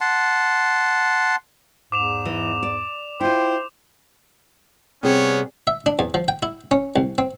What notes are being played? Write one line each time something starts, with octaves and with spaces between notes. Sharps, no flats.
F#5 A5 C6
E2 G#2 D6 E7 F7
E3 D#5
D5
E4 F4 C5 G5
C3 G3 B3 C#4 G#4 C#5
E5
D4
E2
F3
G5
E4
C#4
C2
C4